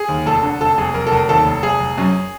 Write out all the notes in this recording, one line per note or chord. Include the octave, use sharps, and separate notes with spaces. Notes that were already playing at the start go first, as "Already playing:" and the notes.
Already playing: G#4
D#2
F1 A4
D3
F1 A4
F1 G#4
F1 A#4
A4
F1 A#4
D#2 A4
F1
F1 G#4
F1
F#2